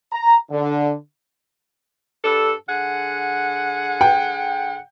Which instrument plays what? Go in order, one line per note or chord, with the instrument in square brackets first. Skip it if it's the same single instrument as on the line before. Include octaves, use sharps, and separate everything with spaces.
[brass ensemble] A#5
D3
[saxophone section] G2 D4 A4
D3 G#4 F#5
[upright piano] G5